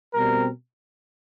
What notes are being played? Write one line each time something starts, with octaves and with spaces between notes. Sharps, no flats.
B2 G3 C4 A#4